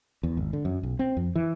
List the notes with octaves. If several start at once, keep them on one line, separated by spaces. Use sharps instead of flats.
E2
G#1
D3
F#2
B1
C4
F2
E3